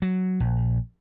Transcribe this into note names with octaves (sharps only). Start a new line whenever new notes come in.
F#3
A#1